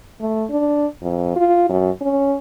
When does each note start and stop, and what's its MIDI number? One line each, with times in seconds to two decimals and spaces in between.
0.20 0.45 57
0.50 0.86 62
1.02 1.33 41
1.36 1.68 65
1.69 1.89 42
2.01 2.36 61